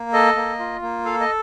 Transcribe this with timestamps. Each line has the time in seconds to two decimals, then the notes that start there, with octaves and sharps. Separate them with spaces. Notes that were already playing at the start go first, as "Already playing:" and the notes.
Already playing: A#3
0.13 A4 D#5
0.36 A#3
0.59 F4
0.82 A#3
1.05 A4 F5
1.20 D#5